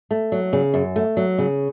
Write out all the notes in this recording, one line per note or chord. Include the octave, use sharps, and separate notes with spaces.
A3
F#3
C#3
F#2
A3
F#3
C#3